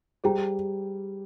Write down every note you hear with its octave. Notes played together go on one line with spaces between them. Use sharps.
G3 G4 G#4 C5 G5 A#5